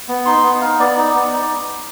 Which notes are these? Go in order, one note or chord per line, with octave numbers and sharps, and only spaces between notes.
B3
D#4 C6
B3
D#4 F5
B3 D5
D#4
B3
D#4